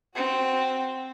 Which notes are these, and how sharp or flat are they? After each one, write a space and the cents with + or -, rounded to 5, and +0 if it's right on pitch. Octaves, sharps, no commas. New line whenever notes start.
C4 +0 F#4 +0